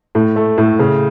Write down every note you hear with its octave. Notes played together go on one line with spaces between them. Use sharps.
A2
A3
A2
C#3